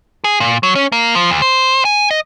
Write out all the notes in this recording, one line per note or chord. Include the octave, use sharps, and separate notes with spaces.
G#4
A#2
F#3
C#4
A#3
F3
D2
C5
G#5
D#5